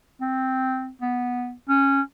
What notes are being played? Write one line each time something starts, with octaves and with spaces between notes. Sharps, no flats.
C4
B3
C#4